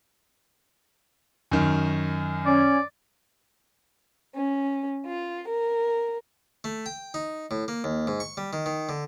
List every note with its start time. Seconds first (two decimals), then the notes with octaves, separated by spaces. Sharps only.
1.51 F#2 D#3
2.46 C#4 D5
4.35 C#4
5.05 F4
5.48 A#4
6.64 A3
6.86 G5
7.14 D#4
7.51 A2
7.68 A#3
7.84 D#2
8.07 G#2
8.20 C#6
8.37 G3
8.53 D#3
8.66 D#3
8.89 D3